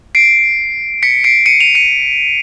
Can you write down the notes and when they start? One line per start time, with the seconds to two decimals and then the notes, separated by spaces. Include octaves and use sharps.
0.15 C7 D7
1.03 B6 C#7
1.24 C7 D7
1.46 C#7 D#7
1.60 D#7 F7
1.75 C#7 D#7